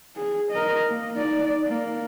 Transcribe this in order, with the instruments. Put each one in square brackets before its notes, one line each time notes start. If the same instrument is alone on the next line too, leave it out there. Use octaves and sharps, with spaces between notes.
[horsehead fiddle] G#4
A#4 D#5
A#3
D#4 D5
A#3